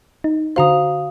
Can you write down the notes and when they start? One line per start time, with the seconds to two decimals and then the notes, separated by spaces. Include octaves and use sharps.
0.24 D#4
0.56 D3 F#4 C5 F5 A#5 D#6